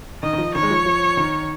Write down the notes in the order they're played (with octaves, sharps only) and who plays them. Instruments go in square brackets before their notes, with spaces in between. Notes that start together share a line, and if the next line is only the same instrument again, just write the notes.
[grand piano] D#3 [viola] D#5
[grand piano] D#3
F3
[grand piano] D#3 [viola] C#5
[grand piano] G#3
F3
F3
D#3